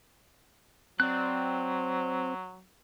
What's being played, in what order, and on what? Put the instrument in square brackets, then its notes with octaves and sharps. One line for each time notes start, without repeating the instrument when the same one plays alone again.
[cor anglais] F#3 [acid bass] C4 [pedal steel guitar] D5 F#6